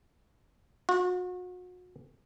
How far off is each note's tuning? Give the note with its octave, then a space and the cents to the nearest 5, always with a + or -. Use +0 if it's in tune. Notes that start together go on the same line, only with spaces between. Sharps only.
F#4 -35